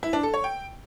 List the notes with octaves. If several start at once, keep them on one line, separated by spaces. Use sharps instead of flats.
E4
D4
A4
C#5
G5